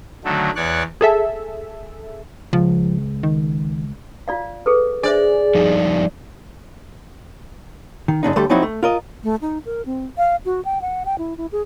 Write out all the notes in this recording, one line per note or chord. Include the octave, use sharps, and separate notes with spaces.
D3 D#3 F#3 A3
E2 C#5 D5 F#6
G#4 A4 E5
C#2 F3
D#3
F4 D5 F5
G#4 A4 B4
D4 G#4 C5 D5 E5
F3 G3 D#4
D#3
F#2 C#3 D4 D#4
D2 G3 A3 A4 C5
F3 F#3 C4 D#4 E4 F#4
A3
F4 A#4 D#5
A3
D#4
A#4
C4
F5
F#4
G5
F#5
G5
E4
E4
G#4